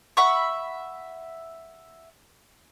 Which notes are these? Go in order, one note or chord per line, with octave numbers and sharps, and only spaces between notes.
E5 F#5 B5 C#6